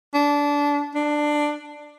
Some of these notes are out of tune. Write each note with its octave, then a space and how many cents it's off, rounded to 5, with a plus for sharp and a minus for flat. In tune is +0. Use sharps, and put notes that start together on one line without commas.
D4 -20
D4 +10